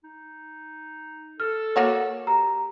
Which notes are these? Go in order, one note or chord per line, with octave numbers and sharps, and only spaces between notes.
D#4
A4 F6
A#3 F#4 C#5
G4 A#5